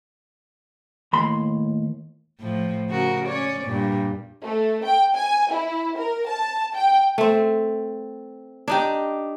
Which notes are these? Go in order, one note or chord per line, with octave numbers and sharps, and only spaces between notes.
D#2 A2 B5 C6
A2 F3
C#3 F#4 A#4
C#4 C#5 D5
G2 A#2
A3
G5
G#5
E4
A#4
A5
G5
A3 C4
D4 D#4 G4